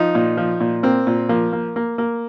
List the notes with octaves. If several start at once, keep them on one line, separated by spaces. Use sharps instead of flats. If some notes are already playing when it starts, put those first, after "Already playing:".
Already playing: F3 D#4
A#2
F3
A#2
A#3 C4
A#2
F3 A#3
A#3
A#3
A#3